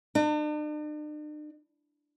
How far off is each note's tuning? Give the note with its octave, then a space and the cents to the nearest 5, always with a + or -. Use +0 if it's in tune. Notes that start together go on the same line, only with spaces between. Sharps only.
D4 +45